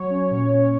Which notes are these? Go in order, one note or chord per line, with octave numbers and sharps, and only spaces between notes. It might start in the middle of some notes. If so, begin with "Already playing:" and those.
Already playing: F#3 C#5
C#4
A#2
C#4